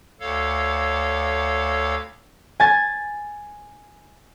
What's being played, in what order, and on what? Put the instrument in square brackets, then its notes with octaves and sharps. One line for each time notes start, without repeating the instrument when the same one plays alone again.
[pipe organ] D2 A4 C#5 F5
[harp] G#5 A6